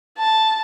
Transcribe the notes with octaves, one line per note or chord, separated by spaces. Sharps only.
A5